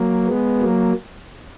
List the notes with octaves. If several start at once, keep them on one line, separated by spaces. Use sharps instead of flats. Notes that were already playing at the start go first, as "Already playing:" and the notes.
Already playing: F#3 A#3
G#3 B3
F#3 A#3